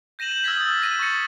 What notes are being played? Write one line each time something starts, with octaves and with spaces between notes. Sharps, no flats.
G6 A#6 D#7 E7 F#7
G6 F#7
E6 F6 G6 G#6 A#6 B6
D#6 A6
A#6 B6 D#7
C#6 G6 A6 A#6 C#7